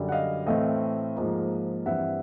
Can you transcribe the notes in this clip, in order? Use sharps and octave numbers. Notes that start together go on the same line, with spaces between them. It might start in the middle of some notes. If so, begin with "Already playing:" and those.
Already playing: F#2 D3 G3
F#5
D#5 F5
A2 E3 A3 C4 D#5 F5
G#2 F3 A#3
G2 E3 G3 C4 E5 F#5